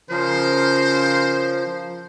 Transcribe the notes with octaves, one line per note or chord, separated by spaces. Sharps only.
C#3 F3 A#4 C5